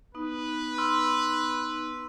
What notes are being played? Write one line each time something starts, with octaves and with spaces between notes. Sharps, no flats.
B3 D#4 B4
C6 E6 F6